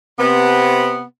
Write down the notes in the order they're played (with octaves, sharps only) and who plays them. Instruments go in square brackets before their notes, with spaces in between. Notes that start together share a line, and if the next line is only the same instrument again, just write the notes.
[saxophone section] C3 B3